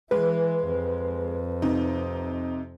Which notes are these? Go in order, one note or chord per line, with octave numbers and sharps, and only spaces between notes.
E3 G#3 B4
F2
C3 D#4